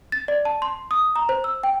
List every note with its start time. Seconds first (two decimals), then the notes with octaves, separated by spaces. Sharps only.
0.12 A6
0.28 D5
0.45 A5
0.62 C6
0.91 D#6
1.16 A#5
1.29 C5
1.44 E6
1.63 G5